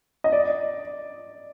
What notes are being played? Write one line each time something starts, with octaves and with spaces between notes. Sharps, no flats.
D#5
D5